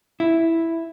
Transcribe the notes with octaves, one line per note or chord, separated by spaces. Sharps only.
E4